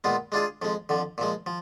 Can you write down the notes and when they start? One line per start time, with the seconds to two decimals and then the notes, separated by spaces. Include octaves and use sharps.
0.04 A#2 G#3 B3 F4
0.32 G#3 D4 F4 G#4
0.62 F2 F3 G#3
0.89 F2 D3 F3
1.18 A#2 F3 G#3
1.46 F3